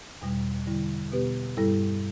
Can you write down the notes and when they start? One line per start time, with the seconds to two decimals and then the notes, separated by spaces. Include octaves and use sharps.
0.22 E2 B2 G3
0.67 D3 G3 E4
1.12 B2 B3 G4 B4
1.57 G2 G3 E4 A4